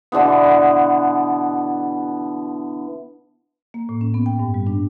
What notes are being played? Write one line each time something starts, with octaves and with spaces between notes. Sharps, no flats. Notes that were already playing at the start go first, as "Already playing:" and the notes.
B2 D3 E3 B3
A#3
A2
C#4
B3
G5
G2
G3
D4